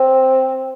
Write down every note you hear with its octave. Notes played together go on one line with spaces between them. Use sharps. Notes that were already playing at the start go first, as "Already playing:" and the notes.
Already playing: C4